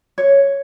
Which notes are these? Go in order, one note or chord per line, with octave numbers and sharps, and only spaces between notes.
C#5